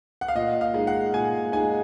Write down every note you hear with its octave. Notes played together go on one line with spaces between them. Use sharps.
F#5
F5
A#2 D#5
F5
G#3 D#4
F#5
A#2 G#5
G#3 D#4 G#5